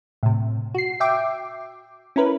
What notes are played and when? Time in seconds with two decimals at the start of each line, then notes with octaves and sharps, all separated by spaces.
0.23 A2 C3
0.75 F#4 C7
1.00 E5 G5 D6
2.16 C#4 E4 A#4 B4